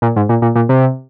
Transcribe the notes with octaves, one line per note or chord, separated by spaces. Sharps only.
A#2
G#2
A#2
A#2
A#2
C3